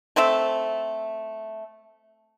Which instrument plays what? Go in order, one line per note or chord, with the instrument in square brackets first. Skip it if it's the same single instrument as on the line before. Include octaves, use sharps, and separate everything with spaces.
[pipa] A3 C4 A4 E5